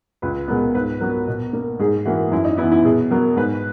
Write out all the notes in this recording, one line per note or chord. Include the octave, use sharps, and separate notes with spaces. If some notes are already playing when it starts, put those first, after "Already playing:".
C#2 B4
B2 G#3 B3 A#4
G#2 B4
F#3 B3 A#4
B2
A#3
G#2 G#4
E3 A#3 F#4
F#2 E4
D#4
E3 B3 E4
E4
B2 G#4
F#3 B3 A#4
G#2 B4